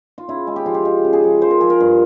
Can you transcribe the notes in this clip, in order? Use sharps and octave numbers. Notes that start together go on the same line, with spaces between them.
F4
C#3 E4
G#3
G4
F3 F4
G4
G#3 G4
C#3
G#4
F3
F3 C5
A#4
F3 G#4
A#4
G2